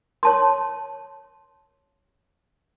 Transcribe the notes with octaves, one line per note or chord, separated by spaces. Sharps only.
C#5 A5 C6